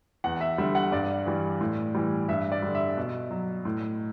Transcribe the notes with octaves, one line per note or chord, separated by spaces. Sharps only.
E2 F#5
E5
D3 G3 E5
F#5
G2 D5
E3 G3
A2
E3 G3
G2 E5
D5
D3 G3
E5
B2
F#3
A2